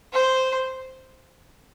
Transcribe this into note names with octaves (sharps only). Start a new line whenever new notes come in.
C5